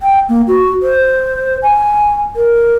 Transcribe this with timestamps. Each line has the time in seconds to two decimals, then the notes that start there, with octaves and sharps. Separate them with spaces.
0.02 G5
0.29 A#3
0.47 F#4
0.83 C5
1.63 G#5
2.36 A#4